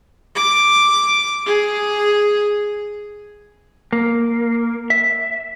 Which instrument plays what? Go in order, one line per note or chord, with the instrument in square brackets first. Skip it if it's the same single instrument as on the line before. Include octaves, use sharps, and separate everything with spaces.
[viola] D6
G#4
[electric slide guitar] A#3
E5